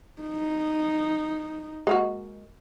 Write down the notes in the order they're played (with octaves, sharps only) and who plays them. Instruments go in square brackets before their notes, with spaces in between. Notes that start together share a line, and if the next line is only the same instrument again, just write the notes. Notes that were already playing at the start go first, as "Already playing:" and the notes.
[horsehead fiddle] D#4
[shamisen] G#3 A#3 F#4